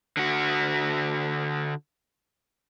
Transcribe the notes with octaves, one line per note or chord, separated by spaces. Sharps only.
D3 F#4